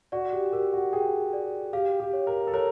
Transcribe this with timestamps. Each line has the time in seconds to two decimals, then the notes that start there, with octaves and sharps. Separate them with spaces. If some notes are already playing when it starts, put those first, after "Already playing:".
0.12 F#4 D5
0.33 G4
0.53 G4 A#4
0.73 F#4
0.93 G#4 G5
1.33 D5
1.73 G4 F5
2.00 G4
2.13 C#5
2.27 A#4
2.47 A4
2.54 A#4 C#5